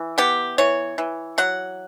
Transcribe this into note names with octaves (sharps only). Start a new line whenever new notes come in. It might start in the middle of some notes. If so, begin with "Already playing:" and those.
Already playing: E3
B3 G4
E3 C#5
E3
F#3 F#5